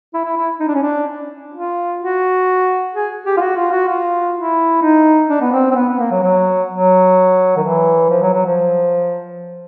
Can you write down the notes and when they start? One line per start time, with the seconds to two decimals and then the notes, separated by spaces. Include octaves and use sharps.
0.14 E4
0.25 E4
0.37 E4
0.60 D#4
0.68 D4
0.74 C#4
0.83 D4
1.54 F4
2.01 F#4
2.95 G#4
3.26 G4
3.37 F4
3.41 F#4
3.57 F4
3.72 F#4
3.88 F4
4.35 E4
4.82 D#4
5.29 D4
5.42 B3
5.52 C4
5.71 C4
5.75 B3
5.88 B3
5.99 A#3
6.11 F#3
6.22 F#3
6.70 F#3
7.57 D#3
7.64 E3
8.10 F3
8.22 F#3
8.33 F#3
8.46 F3